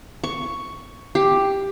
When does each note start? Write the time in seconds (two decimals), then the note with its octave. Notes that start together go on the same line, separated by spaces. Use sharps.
0.24 C#6
1.15 G4